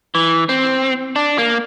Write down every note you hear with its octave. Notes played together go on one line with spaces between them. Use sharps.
E3
C4
D4
A#3